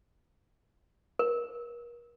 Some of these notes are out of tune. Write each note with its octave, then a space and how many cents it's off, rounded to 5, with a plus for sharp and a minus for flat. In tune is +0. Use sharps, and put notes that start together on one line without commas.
A#4 +40